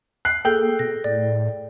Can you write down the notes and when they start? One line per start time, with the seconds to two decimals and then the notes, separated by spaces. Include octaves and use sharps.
0.25 F#6 C7
0.45 A#3 G#4 A4 G5 G6
0.79 B2 A#6
1.04 A2 D5